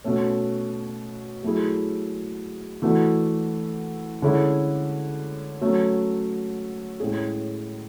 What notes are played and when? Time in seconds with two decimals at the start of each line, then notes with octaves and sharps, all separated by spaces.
0.04 B2 A3 C#4
1.43 F#3 A3 E4 G#4
2.82 E3 A3 D4 F#4 A4
4.22 D3 G#3 C#4 E4 G#4
5.61 F#3 A3 C#4
7.00 A2 G#3 C#4 G#4